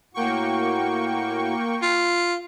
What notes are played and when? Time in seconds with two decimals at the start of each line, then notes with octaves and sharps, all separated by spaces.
0.14 A2 A#3 F#4 G5 C#6
1.83 F4